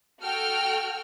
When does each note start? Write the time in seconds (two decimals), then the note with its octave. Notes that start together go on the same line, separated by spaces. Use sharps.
0.22 F#4 A4 G5 F6